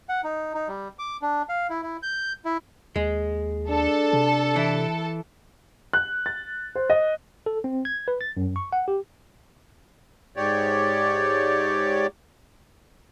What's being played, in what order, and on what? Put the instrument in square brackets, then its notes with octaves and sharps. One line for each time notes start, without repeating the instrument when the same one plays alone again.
[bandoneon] F#5
D#4
D#4
G3
D6
D4
F5
E4
E4
G6
E4
[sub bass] D#2 [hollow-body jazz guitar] G#3
[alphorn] D4 [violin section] A4
[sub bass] C3
[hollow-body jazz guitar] E3 E4
[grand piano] F#6
A6
C5
D#5
[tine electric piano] A4
C4
G#6
B4
A6
F#2
C#6
F#5
G4
[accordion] G#2 G4 C#5 D5